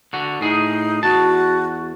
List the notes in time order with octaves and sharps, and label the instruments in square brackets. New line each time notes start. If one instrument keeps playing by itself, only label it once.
[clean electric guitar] D3 F#4
[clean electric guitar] A2 G#4 [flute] D#4
[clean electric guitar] E2 A5 [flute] F#4